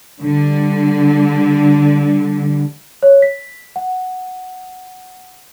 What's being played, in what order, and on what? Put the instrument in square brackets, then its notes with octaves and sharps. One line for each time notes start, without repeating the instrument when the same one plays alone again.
[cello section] D3 G3
[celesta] C#5
B6
F#5